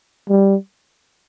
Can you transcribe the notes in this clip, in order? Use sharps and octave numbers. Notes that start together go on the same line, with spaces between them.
G3